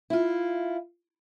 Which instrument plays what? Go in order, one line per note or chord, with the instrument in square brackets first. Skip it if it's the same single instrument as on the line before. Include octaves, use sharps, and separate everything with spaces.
[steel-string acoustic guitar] E4 F4